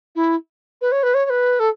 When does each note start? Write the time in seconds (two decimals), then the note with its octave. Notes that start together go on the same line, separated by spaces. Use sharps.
0.15 E4
0.81 B4
0.91 C#5
1.03 B4
1.14 C#5
1.25 C#5
1.29 B4
1.59 A4